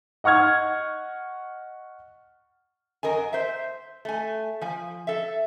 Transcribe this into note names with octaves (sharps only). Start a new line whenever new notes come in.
D#5 F#5 C#6 F6 G#6
F#2 A#4 D#5 G#5
C5 E5
A3 G#5
F3 G#5
A4 E5